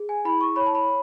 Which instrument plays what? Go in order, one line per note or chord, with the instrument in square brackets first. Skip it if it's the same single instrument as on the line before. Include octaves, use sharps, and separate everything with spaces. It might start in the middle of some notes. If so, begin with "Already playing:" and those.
Already playing: [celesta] G#4
G#5
E4 B5
C#6
C#5 B5
A5
B5